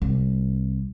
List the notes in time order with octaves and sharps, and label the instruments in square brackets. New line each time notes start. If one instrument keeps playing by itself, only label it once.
[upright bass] C2 C4